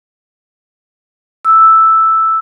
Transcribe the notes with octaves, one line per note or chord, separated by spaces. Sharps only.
E6